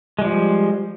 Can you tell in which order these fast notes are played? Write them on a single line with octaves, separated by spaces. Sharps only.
G#3 G3 F3